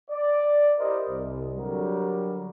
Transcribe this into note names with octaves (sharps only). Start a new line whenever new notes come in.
D5
E4 G4 A#4 C5 D#5
C2
D3 F#3 G3 A#4